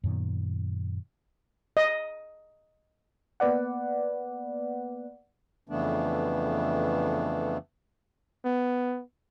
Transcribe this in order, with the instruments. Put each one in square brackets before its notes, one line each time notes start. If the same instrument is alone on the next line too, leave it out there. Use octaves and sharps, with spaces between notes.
[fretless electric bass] F#2 A#2 D#3 B3
[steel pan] D#5
[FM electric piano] A#3 B3 B4 D5 F#5
[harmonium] F2 C#3 E3 A3 B3 D4
[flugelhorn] B3